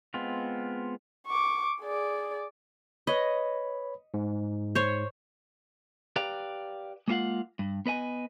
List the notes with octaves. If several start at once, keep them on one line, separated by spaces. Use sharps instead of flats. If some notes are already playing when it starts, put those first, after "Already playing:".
G#3 B3 C4 F4
C#6 D6
G#4 D5
B4 C#5 D#5 B5
G#2
C5 C#5
G4 B4 D5 F5 G5 A#5
G#3 A#3 B3 F4 F5 F#5
G2
B3 B4 D#5 G#5